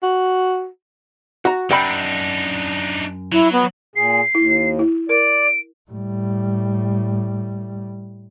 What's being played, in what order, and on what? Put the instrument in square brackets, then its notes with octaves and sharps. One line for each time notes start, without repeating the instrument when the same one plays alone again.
[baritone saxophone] F#4
[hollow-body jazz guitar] F#4 A#5
[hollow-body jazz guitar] F#2 G5 B5 [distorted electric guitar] D4 D#4
[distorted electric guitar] F#3 [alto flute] E4
[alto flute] B3
[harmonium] A#2 G#4 [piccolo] C7
[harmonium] D#2 [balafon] E4
[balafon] E4
[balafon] A#4 [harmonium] D5 [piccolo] D7
[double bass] A2 G3